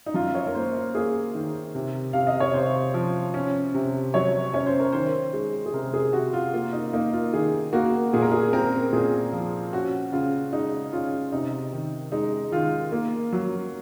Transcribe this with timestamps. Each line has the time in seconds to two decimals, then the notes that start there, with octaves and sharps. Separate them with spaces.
0.06 D#4
0.14 F#2 F4
0.35 C#5
0.47 A#4
0.55 A#3 C5
0.74 A#4
0.95 A#3 G#4
1.35 D#3
1.75 C3
2.13 C3 F5
2.27 D#5
2.40 C#5
2.54 C3 C5
2.94 F3
3.34 C#4
3.74 C3
4.14 F#3 C#5
4.53 C#4 C#5
4.66 C5
4.79 A#4
4.92 D#3 C5
5.33 G#3
5.66 G#4
5.73 C3 A#4
5.94 G#4
6.13 C3 F#4
6.33 F4
6.53 A#3 F4
6.73 D#4
6.93 A#3 D#4
7.13 F4
7.33 D#3 G#4
7.73 A#3 F#4
8.13 A#2 G#4
8.22 A#4
8.31 G#4
8.53 C4 A#4
8.93 A#2 G#4
9.32 F3
9.73 C#4 F#4
10.12 C#3 F4
10.53 G#3 D#4
10.93 C#4 F4
11.32 C3 D#4
11.73 D#3
12.12 G#3 D#4
12.52 D#3 F4
12.92 A#3
13.32 F#3